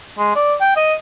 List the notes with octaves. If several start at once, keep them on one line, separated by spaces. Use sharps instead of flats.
G#3
D5
G5
D#5